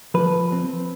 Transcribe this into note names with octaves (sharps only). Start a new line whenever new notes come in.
F3 B4
C4